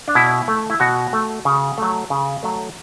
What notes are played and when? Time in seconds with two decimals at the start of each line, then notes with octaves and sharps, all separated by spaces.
0.08 D4
0.15 B2 E4
0.48 A3
0.70 E4
0.80 B2 F#4
1.13 A3
1.45 C#3
1.78 F#3 A3
2.10 C#3
2.43 F#3 A3